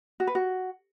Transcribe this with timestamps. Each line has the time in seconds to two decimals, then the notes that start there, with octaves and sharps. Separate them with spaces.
0.20 F#4
0.27 B4
0.35 F#4